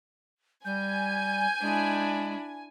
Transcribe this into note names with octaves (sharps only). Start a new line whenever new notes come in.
G3 G#5 G6
G#3 D4 E4